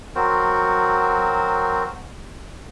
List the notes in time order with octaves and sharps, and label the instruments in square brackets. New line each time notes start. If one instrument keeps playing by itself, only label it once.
[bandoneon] F#3 C4 F#4 A#4 C5